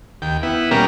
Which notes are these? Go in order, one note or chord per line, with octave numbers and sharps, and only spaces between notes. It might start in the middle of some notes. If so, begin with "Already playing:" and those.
D#2 G5
B3 E4
B2 G3 A#3 C#4 A#4 G5